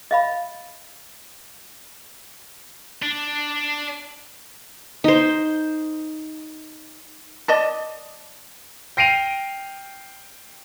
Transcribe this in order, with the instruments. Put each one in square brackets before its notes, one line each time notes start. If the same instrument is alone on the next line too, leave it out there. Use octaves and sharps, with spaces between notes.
[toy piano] D#5 F5 B5
[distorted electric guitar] D4
[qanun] D#4 C5
[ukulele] D5 D#5 A5
[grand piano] G5 A#6 C7 D7 D#7 F7